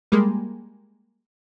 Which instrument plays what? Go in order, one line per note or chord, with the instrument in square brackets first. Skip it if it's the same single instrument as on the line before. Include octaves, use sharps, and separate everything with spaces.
[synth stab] G3 G#3 A#3